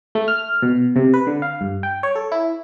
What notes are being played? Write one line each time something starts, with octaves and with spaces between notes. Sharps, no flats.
A3
F6
B2
C3
B4
D3
F5
G2
G5
C#5
A4
E4